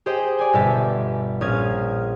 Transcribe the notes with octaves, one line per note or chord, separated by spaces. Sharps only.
G4 G#4 C5 D#5 G5
D5 G#5
G1 B2 G4 E5 A5 B6
A#1 C#4 F5 D#6 G#6